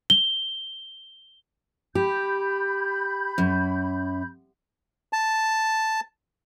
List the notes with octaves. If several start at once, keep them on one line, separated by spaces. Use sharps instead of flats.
G7
G4 B5 G6
F#2
A5